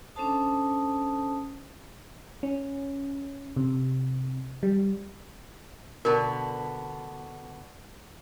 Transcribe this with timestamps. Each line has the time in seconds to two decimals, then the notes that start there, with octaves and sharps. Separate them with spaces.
0.16 C#4 D4 A4 C5 A5 D#6
2.43 C#4
3.56 C3
4.63 G3
6.05 B2 D3 B3 A#4 A5